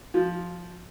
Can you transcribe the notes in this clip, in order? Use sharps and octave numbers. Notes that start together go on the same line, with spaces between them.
F3